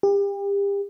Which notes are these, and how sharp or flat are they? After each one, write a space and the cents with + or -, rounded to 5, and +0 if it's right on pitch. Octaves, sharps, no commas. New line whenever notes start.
G4 +35